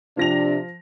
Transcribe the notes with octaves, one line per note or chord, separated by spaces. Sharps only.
C3 F3 D4 A#6 F7